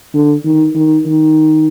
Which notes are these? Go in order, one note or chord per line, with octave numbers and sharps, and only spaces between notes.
D3
D#3
D#3
D#3